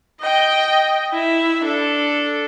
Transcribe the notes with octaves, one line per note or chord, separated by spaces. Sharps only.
D#5 G5
E4 E5
D4 A4